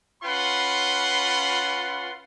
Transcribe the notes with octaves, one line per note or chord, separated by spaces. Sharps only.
C#4 F4 B4 F#5 B5 C6